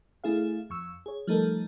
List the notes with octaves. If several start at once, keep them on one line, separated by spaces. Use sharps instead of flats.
A3 E4 G#4 F5
F2 C#6 E6
G#4 C#5
F3 G3 A3 D#4 A4 A#4